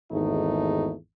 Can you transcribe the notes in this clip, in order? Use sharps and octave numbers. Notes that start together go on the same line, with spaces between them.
G#1 E2 A3 D#4